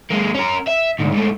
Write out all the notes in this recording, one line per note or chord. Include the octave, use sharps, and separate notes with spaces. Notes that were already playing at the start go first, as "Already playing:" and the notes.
G#3 A#3
C#4 A#4
E5
D2 G#2
G#2 A3